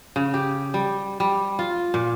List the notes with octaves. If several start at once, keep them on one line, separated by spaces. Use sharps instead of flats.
C#3
G4
G3
G3
F4
A#2